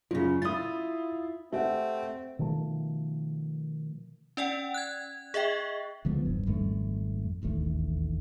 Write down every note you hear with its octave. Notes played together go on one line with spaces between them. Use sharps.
F#2 C#3 F4
E4 F4 D#6 A6
A3 C4 G4 E5 F#5
B2 D#3 F3 A3
C#4 D5 F#5 G5
F#6 G#6
G#4 D#5 E5 G5
C#2 D3 F3 B3
E1 G2
G#1 F2 G3 A3
E1 A1 D#2 A3